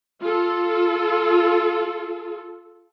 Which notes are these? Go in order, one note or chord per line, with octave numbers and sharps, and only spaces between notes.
F4 A4